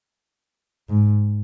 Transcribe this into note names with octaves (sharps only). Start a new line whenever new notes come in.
G#2